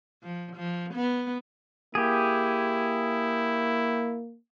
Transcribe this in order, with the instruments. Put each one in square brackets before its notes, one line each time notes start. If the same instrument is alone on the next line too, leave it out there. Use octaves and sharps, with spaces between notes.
[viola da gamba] F3
F3
B3
[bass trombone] A#3 [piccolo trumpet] E4 [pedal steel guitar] G4 G#4